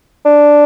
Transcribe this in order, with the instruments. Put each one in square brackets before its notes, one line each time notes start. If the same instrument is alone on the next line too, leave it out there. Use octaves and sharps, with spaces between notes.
[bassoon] D4